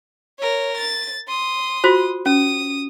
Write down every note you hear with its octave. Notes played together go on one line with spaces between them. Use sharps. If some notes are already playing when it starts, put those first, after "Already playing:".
A#4 C#5
A6
C6 D#6
F4 F#4 C5
C#4 D#6